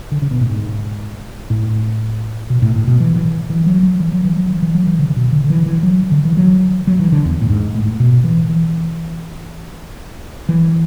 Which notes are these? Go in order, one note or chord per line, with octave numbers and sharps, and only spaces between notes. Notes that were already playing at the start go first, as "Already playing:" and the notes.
D3
C#3
B2
A2
G#2
A2
B2
A2
A2
B2
E3
E3
E3
F#3
F#3
E3
F#3
E3
F#3
E3
E3
F#3
E3
D3
C#3
B2
D3
D3
E3
E3
F#3
D3
E3
F#3
F#3
E3
D3
E2
A2
G#2
A2
B2
E3
E3
E3